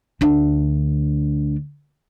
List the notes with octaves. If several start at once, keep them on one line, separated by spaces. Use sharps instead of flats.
D2 D4